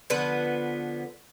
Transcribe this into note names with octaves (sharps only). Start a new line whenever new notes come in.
D3 F3 B3 B4